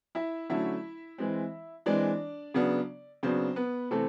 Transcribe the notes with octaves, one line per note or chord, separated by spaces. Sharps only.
E4 E5
D3 F#3 A3 C#4 E4 E5
E3 G#3 C4
E3 G#3 C4 D4 D5
C#3 F#3 B3 D4
C#3 F#3 B3 C4 D4 C5
B3 B4
C3 E3 A3 C4 A4